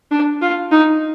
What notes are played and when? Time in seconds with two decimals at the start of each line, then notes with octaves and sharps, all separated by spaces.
0.11 D4
0.42 F4
0.71 D#4